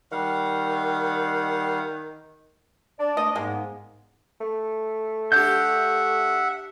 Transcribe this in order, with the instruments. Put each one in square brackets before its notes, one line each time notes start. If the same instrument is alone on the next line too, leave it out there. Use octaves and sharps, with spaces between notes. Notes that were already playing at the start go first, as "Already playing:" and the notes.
[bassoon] D#3 [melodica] G3 F5 F#5
[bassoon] D4 [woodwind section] D5
[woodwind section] A3 [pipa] D#5
[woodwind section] G#2 B3 [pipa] G#3 [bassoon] A#3
[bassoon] A3
[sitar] D4 G4 [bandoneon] E5 F#5 [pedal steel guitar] G6